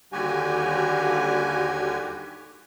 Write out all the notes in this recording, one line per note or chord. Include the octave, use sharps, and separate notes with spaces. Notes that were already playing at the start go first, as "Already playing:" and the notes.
D#2 D3 G3 F#4 G4 G#5